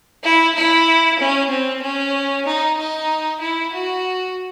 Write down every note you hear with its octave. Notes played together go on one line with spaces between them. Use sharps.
E4
E4
C#4
C4
C#4
D#4
D#4
E4
F#4